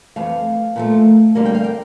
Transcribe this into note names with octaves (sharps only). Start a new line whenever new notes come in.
F2 E3 A3 F5
A#2 F3 A3
F2 D3 G3 A#3
G5
F5
G5